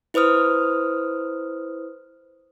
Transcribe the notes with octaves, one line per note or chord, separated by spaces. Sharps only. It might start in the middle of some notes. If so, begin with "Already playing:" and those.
E4 B4 C5 D#6 F6